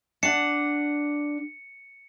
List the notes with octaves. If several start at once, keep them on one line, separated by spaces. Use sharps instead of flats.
D4 F#5 C#7